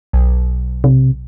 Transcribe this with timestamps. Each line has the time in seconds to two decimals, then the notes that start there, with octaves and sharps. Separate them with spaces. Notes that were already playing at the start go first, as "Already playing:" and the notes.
0.13 B1
0.84 C3